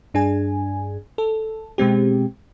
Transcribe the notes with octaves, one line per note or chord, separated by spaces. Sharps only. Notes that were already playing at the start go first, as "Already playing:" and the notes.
G2 D4 G#4 G#5
A4
B2 G#3 C4 G4